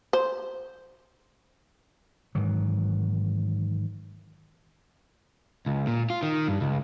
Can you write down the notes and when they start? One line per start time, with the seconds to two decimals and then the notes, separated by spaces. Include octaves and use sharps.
0.13 C5
2.35 G#2 D#3 E3 F#3
5.66 C#2
5.87 A#2
6.10 F4
6.23 D#3
6.48 G2
6.61 C#2